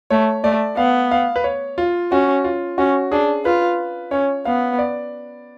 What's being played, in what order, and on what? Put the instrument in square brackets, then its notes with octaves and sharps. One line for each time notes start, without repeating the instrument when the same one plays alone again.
[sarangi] A3 [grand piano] C#5
[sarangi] A3 [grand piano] D5
[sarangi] B3 [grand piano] F5
[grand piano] F5
B4
C#5
F4
[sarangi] C#4 [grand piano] F#4
[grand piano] F4
[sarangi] C#4 [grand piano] F#4
[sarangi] D4 [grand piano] G#4
[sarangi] F4 [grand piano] B4
[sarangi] C#4 [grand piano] C#5
[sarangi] B3 [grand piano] F5
[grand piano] D5